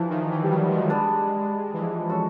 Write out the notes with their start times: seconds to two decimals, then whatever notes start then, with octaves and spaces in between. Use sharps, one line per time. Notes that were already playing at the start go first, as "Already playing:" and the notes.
Already playing: E3 F3 D4 G4 B4
0.10 D#3
0.31 E3
0.43 G3
0.50 F#3
0.63 G3
0.70 G#3
0.90 G3 B3 D4
1.73 E3
1.79 F3
2.09 C#4 F#4 A4 C#5